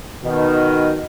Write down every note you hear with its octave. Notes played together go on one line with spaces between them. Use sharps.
B2 D#3